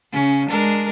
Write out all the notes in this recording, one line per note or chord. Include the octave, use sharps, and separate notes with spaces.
C#3 C#4
G#3 D4 A#4